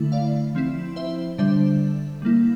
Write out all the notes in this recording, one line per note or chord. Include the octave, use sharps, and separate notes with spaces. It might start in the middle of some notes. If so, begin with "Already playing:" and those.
Already playing: D3 A3 E4
D5 F5
F3 C4 E4
C5 E5
D3 G3 D4 C5 E5
G3 A#3 E4